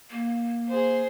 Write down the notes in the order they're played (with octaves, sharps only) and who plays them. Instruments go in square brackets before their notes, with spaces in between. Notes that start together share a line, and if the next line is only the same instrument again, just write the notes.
[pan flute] A#3
[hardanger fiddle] G#4 C5